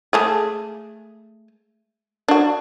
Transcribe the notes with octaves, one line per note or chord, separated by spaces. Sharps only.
G#3 A3 G#4
D4 F#4